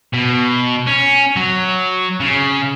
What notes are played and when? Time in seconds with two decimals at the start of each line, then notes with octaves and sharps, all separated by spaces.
0.14 B2
0.87 C#4
1.36 F#3
2.20 C#3